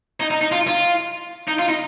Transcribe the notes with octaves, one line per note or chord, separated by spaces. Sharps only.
D#4
D#4
D#4
F4
F4
D#4
F4
D#4